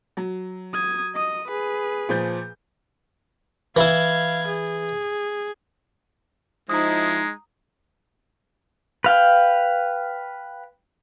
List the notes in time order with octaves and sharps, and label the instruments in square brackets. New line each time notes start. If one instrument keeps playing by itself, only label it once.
[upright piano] F#3
[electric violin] D#6 G#6
D#5 D#6
G#4 B4
[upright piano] A#2 F3 G6
[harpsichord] E3 E4 [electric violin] F5 G#6
[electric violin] G#4
[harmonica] F3 E4 C5 [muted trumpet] G#3 [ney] D#4 [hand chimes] A#5 D#6
[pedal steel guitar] B4 F5 G5